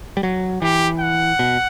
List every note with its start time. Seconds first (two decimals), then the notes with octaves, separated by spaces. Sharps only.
0.17 G3
0.23 F#3
0.62 E3 G4
1.00 F#5
1.39 B2